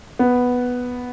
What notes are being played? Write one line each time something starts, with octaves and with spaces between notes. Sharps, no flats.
B3